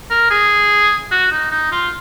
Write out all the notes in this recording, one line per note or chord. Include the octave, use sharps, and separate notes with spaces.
A#4
G#4
F#4
D#4
D#4
F4